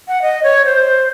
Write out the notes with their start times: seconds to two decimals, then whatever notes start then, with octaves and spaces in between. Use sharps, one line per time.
0.08 F#5
0.22 D#5
0.44 C#5
0.65 C5